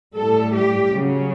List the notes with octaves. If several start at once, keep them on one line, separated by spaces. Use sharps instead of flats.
A2 G3 A4
G4
C#3 F#3